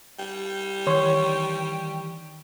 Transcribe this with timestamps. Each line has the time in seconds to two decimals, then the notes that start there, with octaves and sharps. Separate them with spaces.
0.19 G3
0.87 D#3 E3 C#5 C6 C#6